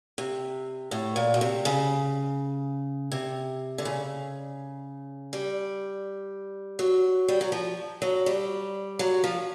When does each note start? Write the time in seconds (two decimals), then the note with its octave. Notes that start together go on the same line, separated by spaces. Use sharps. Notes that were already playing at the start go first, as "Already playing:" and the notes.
0.18 C3
0.91 A2
1.16 A#2
1.34 B2
1.41 C3
1.65 C#3
3.12 C3
3.78 D3
3.85 C#3
5.33 G3
6.79 F#3
7.28 G3
7.41 F#3
7.52 F3
8.02 F#3
8.26 G3
8.99 F#3
9.24 F3